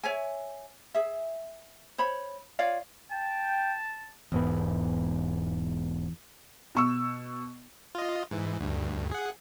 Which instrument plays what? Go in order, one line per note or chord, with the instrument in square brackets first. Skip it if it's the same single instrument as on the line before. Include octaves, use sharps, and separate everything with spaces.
[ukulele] C#5 E5 G#5
G#4 E5
C5 C#5 B5
F4 C#5 D5 F5
[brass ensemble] G5 [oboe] A5
[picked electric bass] E1 G#2 B3 [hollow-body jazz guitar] E2
[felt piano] B2 C#6 E6
[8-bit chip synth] F4 D#5
G#2 E3
D2 G2
G#4 F#5